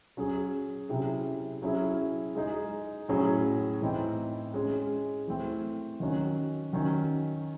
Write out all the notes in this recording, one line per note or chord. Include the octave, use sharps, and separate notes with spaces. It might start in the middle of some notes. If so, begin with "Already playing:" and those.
F#3 C#4 G#4
C3 F#3 C#4 E4 G#4
F#3 C#4 E4 G#4
G#3 D#4 G#4
A2 F#3 C#4 G#4
A2 E3 C4 D#4
G#3 C#4 G#4
E3 A3 C4
D#3 F#3 C#4 F#4
D#3 F#3 C#4